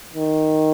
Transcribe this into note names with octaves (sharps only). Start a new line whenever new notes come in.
D#3